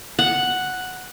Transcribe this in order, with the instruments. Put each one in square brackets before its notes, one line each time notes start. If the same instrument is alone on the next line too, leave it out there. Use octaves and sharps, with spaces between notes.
[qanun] F#5